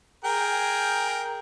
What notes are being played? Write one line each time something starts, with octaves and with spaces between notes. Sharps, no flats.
G#4 A#4 G5